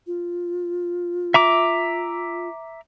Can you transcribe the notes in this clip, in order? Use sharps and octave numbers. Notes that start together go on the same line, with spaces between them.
F4
E5 A#5 D6